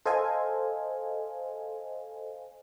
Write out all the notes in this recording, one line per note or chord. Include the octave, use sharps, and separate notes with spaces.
A4 C5 D#5 F5 G#5